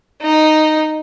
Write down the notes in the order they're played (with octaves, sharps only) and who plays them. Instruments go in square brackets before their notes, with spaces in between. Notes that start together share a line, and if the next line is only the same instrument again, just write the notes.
[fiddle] D#4